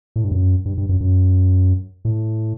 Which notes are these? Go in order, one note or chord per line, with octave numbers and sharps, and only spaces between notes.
A2
G2
F#2
G2
G2
F#2
F#2
A2